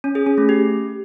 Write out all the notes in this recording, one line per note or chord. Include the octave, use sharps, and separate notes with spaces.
C#4
G#4
C#4
A3
G4